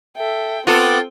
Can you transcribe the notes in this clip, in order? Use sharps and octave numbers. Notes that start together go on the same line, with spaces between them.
A4 E5 G5
B3 C4 F4 A4 F#5 G5 D6 A6